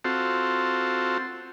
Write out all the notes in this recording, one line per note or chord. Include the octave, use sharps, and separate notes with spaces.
C4 F4 F#4 A4 C5